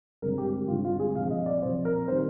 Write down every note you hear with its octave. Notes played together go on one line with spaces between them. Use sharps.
G2 D3 G#3 C4 A#4
G4
G4
G2 D3 G#3 C4 F4
F4
G#4
A#2 F3 C4 F5
D#5
D5
A#2 F3 C4 C5
A#4
D#3 G3 C4 C5